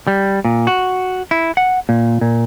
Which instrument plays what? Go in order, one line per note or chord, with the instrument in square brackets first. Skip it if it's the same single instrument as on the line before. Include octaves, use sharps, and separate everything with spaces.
[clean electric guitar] G3
A#2
F#4
E4
F#5
A#2
A#2